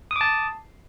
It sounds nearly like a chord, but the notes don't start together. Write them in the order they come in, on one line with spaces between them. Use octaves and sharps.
D#6 D6 A5